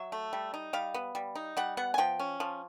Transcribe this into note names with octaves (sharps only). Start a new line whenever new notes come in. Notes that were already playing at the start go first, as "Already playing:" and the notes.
Already playing: F#3 E5
A3
G3
D#4
G3 F5
B3
G3
D#4
G3 F#5
B3 F#5
G#5
F3 G5
C#4
F3